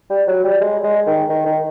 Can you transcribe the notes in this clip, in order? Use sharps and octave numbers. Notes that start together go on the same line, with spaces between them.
G3
F#3
G3
G#3
G#3
D#3
D#3
D#3